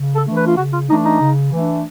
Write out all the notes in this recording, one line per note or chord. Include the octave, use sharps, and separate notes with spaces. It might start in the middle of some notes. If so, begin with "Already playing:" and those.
Already playing: C#3
A4
E3 A3 D4
B4
F4
C#3 F#4
F4
E3 A3 D4 D#4
D#4
C#3
E3 A3 D4